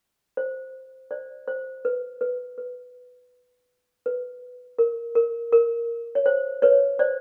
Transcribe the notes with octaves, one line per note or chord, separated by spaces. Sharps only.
C5
C5 D5
C5
B4
B4
B4
B4
A#4
A#4
A#4
C#5
C5
B4 C#5
C5 D5